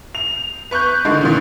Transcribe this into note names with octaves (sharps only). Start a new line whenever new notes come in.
F7
B4 C#6 F#6 G6
D3 D#3 G#3 A3
A#2 C#3 E3